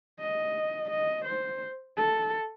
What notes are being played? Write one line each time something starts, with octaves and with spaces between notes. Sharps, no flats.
D#5
D#5
C5
A4